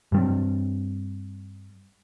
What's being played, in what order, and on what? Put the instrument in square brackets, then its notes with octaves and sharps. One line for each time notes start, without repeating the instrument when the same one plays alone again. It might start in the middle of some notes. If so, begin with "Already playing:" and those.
[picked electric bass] G2 G3 C4